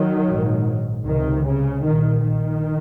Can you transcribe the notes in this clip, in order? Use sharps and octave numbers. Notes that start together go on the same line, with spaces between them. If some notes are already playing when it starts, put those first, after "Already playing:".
Already playing: D#3 F#3
A#1 G#2
C#2 C3 D#3
C#3
A#1 A#2 D#3
D#3